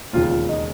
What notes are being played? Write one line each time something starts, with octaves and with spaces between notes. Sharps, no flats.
E1 D#2 C#3 F4
F4
D#4